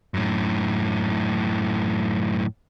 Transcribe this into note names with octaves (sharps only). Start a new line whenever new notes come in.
F#2 A2